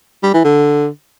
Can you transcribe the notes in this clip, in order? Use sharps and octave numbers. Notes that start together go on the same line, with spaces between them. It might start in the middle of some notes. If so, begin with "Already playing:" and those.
G3
E3
D3